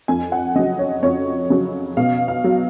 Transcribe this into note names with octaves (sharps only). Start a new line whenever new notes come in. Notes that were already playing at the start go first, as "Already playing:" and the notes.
F2 G#5
F#5
C#3 F#3 D#5
C#5
F2 C#5
C#3 F#3
B2 F5
F5
F#3